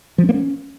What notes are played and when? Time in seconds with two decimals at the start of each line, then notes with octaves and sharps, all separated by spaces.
0.18 F3
0.24 C#4
0.29 A#3
0.34 C#4